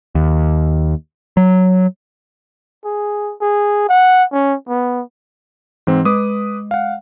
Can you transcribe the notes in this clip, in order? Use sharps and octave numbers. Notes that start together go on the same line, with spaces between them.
D#2
F#3
G#4
G#4
F#5
C#4
B3
G#2 E3 C4
G#3 B4 D6 D#6
F5 F#5